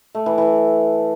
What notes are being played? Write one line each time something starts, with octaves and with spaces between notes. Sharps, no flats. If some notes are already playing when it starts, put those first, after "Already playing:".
A3
E3
E3